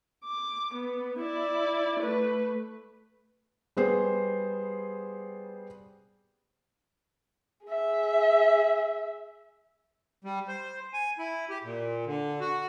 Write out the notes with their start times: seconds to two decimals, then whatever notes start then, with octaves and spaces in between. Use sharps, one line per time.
0.24 D6
0.74 B3
1.20 E4 D5
2.00 A3 B4
3.77 G3 B3 G#4 C5
7.67 G#4 E5
10.24 G3
10.48 C5
10.93 G#5
11.19 E4
11.50 G4
11.64 A#2
12.06 D3
12.40 F#4